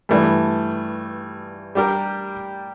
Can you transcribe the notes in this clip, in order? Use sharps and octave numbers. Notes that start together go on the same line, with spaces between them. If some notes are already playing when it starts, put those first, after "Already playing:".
G2 E3 A3 D4
G3 D4 G4 A#4